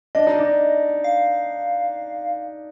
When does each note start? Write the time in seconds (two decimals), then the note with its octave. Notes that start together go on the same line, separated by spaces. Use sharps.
0.15 D4 D#5
0.27 D#4
0.39 D4
1.04 F5